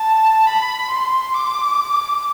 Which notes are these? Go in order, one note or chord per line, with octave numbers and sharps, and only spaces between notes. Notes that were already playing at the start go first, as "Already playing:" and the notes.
Already playing: A5
B5
C6
D6